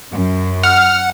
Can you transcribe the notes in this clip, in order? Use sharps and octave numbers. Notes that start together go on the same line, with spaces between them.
F#2
F#5 F6